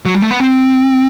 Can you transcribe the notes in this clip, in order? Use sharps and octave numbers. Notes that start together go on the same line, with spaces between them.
F#3
G3
A3
B3
C4